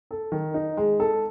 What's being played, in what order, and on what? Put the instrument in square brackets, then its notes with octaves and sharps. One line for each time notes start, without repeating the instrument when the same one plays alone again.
[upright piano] A4
D#3
D#4
G#3
A4